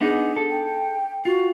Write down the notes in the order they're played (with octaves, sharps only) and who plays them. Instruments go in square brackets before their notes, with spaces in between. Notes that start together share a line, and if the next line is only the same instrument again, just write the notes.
[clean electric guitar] B3 D4 D#4 [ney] G#4
[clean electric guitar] A4
[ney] G5
[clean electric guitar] F4 [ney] F#4